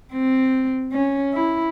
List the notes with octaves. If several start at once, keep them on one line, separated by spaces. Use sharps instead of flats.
C4
C#4
E4